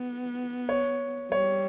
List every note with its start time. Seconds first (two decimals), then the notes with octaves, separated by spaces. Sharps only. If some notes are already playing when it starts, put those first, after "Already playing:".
Already playing: B3
0.69 C#5
1.31 G3 C#5